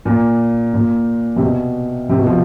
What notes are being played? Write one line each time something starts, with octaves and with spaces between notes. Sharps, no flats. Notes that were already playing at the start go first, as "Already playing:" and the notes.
A#2
A#2
C3
B2
C3
B2
F3